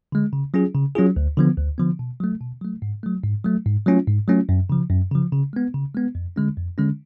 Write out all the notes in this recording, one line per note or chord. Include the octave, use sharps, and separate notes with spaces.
D3 G#3
C#3
F#3 C#4 F4 G#4
C#3
F#3 C#4 F4 G#4
D2
D3 F3 B3
D2
D3 F3 B3
B2
F#3 A3
B2
F#3 A3
G#2
F#3 A3
G#2
F#3 A3
G#2
F#3 A3 C#4 F4
G#2
F#3 A3 C#4 F4
F#2
C#3 F3
F#2
C#3 F3
C#3
G#3 B3
C#3
G#3 B3
F2
D3 G#3 C#4
F2
D3 G#3 C#4